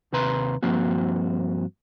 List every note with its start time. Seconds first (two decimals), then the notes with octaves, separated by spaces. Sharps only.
0.13 D#2 C3 B4 A#5 C6
0.63 G2 F3 A#3 C4 F#4